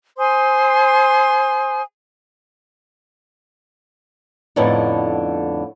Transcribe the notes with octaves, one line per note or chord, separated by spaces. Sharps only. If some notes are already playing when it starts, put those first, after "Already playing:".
C5 G#5 C6 D#6
F2 A2 D3 B3 D#4